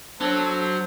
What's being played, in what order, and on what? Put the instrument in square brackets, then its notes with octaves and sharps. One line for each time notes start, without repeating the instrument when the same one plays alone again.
[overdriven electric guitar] F#3 [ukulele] D4 C#5 [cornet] A4 [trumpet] C5